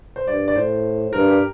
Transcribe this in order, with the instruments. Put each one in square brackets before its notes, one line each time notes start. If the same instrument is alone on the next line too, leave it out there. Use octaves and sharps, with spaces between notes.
[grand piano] C5
[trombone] G2 [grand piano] D5
[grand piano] D5
[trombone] A2 [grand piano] C5
[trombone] G2 [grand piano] A#4
[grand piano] G4